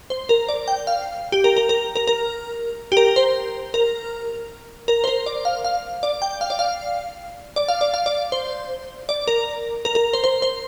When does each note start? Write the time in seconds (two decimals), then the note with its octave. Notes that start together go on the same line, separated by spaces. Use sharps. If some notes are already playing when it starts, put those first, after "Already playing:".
0.10 C5
0.29 A#4
0.49 D5
0.68 G5
0.87 F5
1.32 G4
1.44 A#4
1.57 A#4
1.69 A#4
1.96 A#4
2.07 A#4
2.92 G4
2.97 A#4
3.16 C5
3.74 A#4
4.88 A#4
5.04 C5
5.07 A#4
5.26 D5
5.45 F5
5.65 F5
6.03 D5
6.22 G5
6.41 F5
6.50 D5
6.59 F5
7.56 D5
7.68 F5
7.81 D5
7.94 F5
8.06 D5
8.32 C5
9.09 D5
9.27 A#4
9.85 A#4
9.95 A#4
10.13 C5
10.24 C5
10.42 C5